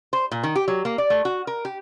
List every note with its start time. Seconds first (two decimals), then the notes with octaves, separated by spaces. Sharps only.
0.13 C5
0.31 A#2
0.43 D#3
0.56 G4
0.68 F#3
0.85 A#3
0.98 D5
1.10 A3
1.25 F#4
1.47 A#4
1.65 G4